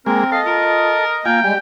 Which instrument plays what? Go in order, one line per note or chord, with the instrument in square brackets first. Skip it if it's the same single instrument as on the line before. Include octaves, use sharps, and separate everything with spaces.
[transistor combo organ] G#3 A#3 [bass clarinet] C4 [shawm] A#4
[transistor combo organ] A4 [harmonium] D#5 [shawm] F5
[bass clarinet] F4 [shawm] A#4
[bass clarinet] A#3 [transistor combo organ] F4 G#5 [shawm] G5
[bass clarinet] G3 [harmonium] G#3 G#5 [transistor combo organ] G4